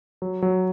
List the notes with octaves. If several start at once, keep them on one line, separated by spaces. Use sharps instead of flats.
F#3
F#3